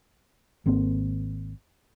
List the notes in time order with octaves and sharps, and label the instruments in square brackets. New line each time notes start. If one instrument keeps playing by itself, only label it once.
[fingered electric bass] G#1 A#3 C4